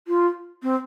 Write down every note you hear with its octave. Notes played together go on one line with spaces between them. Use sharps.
F4
C4